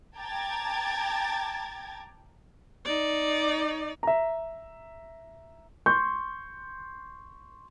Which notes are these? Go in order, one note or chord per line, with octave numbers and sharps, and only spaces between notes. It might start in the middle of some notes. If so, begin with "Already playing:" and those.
G5 A5 A#5 D6 G#6 A6
D#4 D5
E5 A#5
C6 C#6 G6